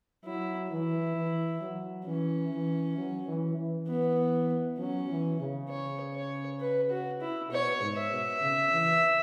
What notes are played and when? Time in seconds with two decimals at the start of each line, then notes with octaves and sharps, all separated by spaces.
0.25 F#3 E4
0.70 E3 E4
1.16 E3
1.61 F#3
2.06 E3 C#4
2.53 E3
2.97 F#3
3.28 E3
3.58 E3
3.88 B3
4.78 F#3 C#4
5.09 E3
5.40 C#3
5.69 C#5
6.15 C#5
6.60 B4
6.90 F#4
7.21 E4
7.50 B2 C#5
7.81 G#2
7.96 E5
8.11 B2
8.42 C#3
8.72 E3